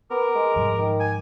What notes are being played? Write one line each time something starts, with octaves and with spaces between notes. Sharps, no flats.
B3 A#4 D6
G#3
G#2 F3 G3
D#3
G#5